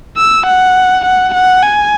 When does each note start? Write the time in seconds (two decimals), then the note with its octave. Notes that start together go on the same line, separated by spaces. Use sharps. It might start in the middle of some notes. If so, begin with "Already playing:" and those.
0.17 E6
0.47 F#5
1.06 F#5
1.34 F#5
1.63 G#5